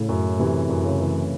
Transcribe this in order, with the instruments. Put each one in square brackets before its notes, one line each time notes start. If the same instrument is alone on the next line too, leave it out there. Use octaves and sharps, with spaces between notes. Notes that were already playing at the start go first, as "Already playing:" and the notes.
Already playing: [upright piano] A2 C#3
[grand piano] F#2
[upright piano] C3 [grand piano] E3
[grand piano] F#2
[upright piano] C#3
[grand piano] E3